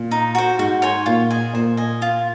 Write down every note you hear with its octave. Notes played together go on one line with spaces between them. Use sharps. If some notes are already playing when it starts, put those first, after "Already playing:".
Already playing: A#2
D#4
F#4 C5
G#2 F#4
C#5 G#5 C6
A#2 F4
G#4 D#5 G#5
A#2 C5
D#5 G#5
F4